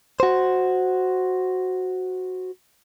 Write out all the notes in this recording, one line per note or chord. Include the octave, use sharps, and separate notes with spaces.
F#4 C5